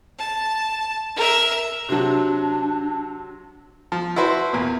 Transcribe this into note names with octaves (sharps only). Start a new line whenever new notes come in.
A5
A#4 E5
C3 F#3 D4
F3
E4 F#4 B4 C5
E2 A#2